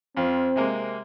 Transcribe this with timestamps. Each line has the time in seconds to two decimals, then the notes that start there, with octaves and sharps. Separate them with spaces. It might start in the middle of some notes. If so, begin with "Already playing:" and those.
0.17 F2 C4 F4
0.56 C3 G#3 A#3